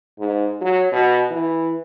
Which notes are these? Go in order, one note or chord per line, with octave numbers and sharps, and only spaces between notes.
G#2
F#3
B2
E3